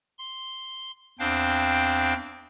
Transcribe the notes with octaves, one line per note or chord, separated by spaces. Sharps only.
C6
E2 C4 D4 C5 F5 G5